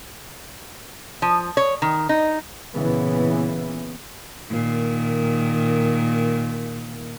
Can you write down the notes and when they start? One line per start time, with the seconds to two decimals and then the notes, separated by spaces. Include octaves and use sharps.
1.22 F3
1.57 C#5
1.82 D#3
2.09 D#4
2.75 A#2 C#3 E3 B3
4.50 A#2 D#3